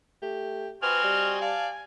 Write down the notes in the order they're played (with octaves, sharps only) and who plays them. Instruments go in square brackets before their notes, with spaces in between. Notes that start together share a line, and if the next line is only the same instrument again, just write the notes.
[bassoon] A3 [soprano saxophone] G4
[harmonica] C4 F#4 D#5 [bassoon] B4 [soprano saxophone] G#5 [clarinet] F6
[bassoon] G3
[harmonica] D5 A5 [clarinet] F5